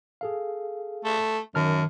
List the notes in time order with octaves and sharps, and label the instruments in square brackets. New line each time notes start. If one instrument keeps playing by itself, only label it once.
[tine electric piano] G#4 A4 F5
[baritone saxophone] A3
[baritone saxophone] F#2 [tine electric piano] D#3 A5 F6